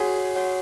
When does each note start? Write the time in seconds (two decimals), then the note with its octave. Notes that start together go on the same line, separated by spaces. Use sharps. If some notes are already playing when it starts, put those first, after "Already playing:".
Already playing: F#4 G#4 C#5 F#5
0.35 F#4 C#5 F#5